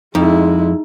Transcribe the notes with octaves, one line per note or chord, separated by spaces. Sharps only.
F2 G#3 D#4 E4